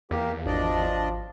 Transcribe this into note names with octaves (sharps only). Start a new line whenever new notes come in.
E2 A#3 G4
G#1 F3 D4 D5 D#5